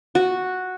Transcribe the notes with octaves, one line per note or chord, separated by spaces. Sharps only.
F#4